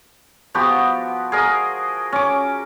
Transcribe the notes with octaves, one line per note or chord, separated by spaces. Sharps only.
F3 B3 F#4 G4
G#4 A#4 D#5
C#4 D6